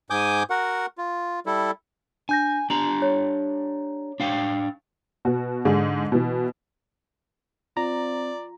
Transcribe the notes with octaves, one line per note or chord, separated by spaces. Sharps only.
G#2 G#5 D6 D#6 G6
F#4 A#4 F#5
F4
G3 E4 A4
D4 G#5 G6 A#6
D4 G4 A#5 F#7
C#5
D4 F5 G5
B2 F#4
G#2 D3 G#4
B2 E3
C4 F4 D5 A#5